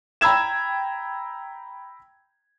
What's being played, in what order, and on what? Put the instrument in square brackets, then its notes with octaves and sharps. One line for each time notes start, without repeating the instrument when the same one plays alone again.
[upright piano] G5 A#5 B5 E6 G#6 E7